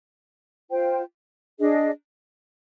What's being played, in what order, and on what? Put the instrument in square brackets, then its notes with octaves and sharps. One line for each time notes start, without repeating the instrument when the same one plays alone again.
[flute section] F4 C5 G5
D4 G#4 D#5